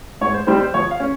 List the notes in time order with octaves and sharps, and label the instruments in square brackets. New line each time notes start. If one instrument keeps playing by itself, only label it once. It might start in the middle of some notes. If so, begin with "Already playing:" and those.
[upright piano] G#2 C#5
C5
G3 C4 D#4 C5
C5
F2 C#5
F5
C#4